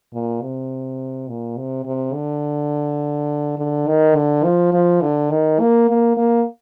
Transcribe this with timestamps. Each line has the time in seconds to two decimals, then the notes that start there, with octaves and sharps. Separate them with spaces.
0.13 A#2
0.42 C3
1.28 A#2
1.57 C3
1.86 C3
2.14 D3
3.58 D3
3.88 D#3
4.16 D3
4.44 F3
4.73 F3
5.02 D3
5.31 D#3
5.60 A#3
5.89 A#3
6.17 A#3